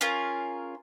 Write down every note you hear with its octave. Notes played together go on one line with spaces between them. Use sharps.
C#4 F4 G#4 A#4